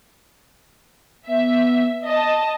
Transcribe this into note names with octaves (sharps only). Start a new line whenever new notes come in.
B3 E5
D#5 A5 D#6